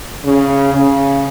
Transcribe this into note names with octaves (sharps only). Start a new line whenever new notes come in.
C#3
C#3